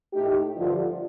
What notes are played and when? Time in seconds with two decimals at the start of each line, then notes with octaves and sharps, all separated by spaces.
0.13 A2 A3 D#4 G4
0.55 G2 D3 F3